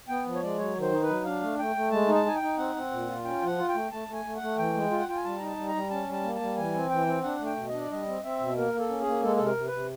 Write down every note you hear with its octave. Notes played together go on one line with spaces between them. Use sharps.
B3 G5
F3
C#5
G#3 D5
F#3 C#5
D#3
C5
D#4
B4
F#3
D4 F5
A3
A3 G5
A3
G#3 A5
D#4
A5
D#4 G#5
G5
D#4
C4 F#5
C4
A#2
F4
C#4 G5
F3 F#5
F4
G5
A3
A3 A5
A3
G#5
A3
F#5
A3
E3 G5
G#3
F4
F#5
F4 G5
G#5
G3 A5
D#4 A#5
A5
G3
A#5
G3
C#4 A5
G3 A5
A#3
A5
G3
E3 G#5
C4
E3 G5
C4
D4 F#5
A3
G5
B2
D4 D#5
D5
G3 D#5
C4
C4 E5
B2
A#3 A#4
A#3
A4
C#4
G#4
A#3
G#3 A4
C3 A4
A#4
C3
B4
C3